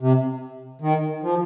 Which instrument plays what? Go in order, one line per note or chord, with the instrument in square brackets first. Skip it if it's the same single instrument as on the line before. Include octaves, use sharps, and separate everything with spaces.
[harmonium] C3
D#3
F3